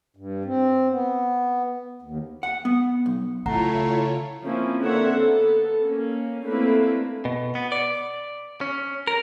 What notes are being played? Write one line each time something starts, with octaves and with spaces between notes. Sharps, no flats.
G2
C4
B3
D#2
F#5
B3
B1
C#3 A3 E4 F4 C#5 F#5 A#5
F3 A#3 C4 C#4 E4
D3 A#3 C4 C#5 E5 F#5
B3 A4
A#3 C#4
A3 A#3 C4 D4 E4 B4
B2
B3
D5
C#4
A#4